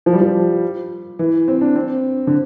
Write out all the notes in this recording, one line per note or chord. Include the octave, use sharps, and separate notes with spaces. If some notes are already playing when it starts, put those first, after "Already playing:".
F3
G3
F3
E3
C4
D4
C4
D3